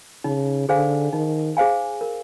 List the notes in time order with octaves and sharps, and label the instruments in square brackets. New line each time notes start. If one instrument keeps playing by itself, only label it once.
[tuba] C#3 [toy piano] D#4
[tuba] D3 [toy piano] G#4 C5 F5 G#5
[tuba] D#3 [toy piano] D#4
[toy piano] G#4 C5 F5 G#5
A#4